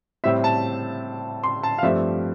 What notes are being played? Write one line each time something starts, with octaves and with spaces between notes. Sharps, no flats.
A2 G3 C4 E5
A5
C6
A5
F5
G2 F3 A3 C4 E5